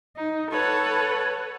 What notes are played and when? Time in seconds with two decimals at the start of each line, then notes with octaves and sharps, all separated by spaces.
0.17 D#4
0.51 A4 B4 C#5 F#5